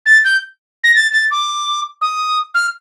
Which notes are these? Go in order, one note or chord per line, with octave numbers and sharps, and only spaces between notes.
A6
G6
A#6
A6
A6
D6
D#6
F6